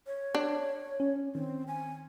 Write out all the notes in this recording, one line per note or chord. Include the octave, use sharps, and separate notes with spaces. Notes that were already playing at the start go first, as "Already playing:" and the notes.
C#5
D4
C#4
D#3 C4
G#5